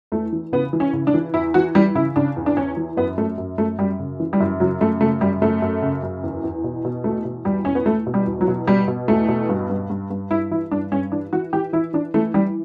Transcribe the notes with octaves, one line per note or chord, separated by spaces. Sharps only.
E2 A3
E3
C#3 B3
E3
C#4
C#3
D4
E3
E2 E4
E3 F#4
E3 G3
C#3 E4
C#3 D4
E2
D4
E2 C#4
E3
F#2 B3
F#2 A3
F#2
F#2 A3
F#2 G3
C#3
E3
G3
F#2
C#3 F#3
F#2 A3
C#3 A3
F#2 G3
F#2 A3
F#2
C#3
F#2
E2
E2
B2
B2
E2 A3
B2
E2 G3
E2 C#4
B3
E2 A3
B2
G3
E2
F#3
B2
B2 G3
B2
E2 A3
B2
G2
G2
G2
G2
G2 E4
E3 E4
G2 D4
G2 C#4
E3 D4
E3 F#4
E3 G4
E3 E4
E3 D4
E3 A3
E3 G3